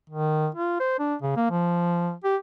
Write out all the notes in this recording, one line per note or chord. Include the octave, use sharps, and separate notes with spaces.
D#3
F4
C5
D4
C#3
A#3
F3
G4